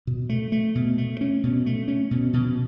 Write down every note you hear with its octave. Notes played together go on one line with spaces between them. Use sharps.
B2
A3
A3
B2
A3
C#4
B2
A3
C#4
B2
B2